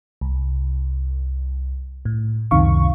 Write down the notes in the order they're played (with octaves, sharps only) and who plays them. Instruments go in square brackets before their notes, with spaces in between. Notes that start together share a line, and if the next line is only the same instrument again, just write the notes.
[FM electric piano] C2
A2
C#2 F#2 C3 D#3 F5 C#6